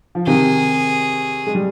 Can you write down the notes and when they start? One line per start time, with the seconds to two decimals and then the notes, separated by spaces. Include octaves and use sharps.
0.15 F3
0.27 C3 D#3 G#4
1.47 G#3
1.55 G3